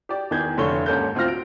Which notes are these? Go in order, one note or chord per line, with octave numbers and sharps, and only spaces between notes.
G4 D5
E2 D#3 E3 G#4 G6 G#6
F1 D3 A4 C#5 C#6 G7
D#2 G#2 C#4 A4 A#4 G6
D2 C4 F4 F6 A#6
D7